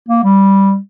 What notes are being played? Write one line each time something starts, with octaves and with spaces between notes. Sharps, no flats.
A#3
G3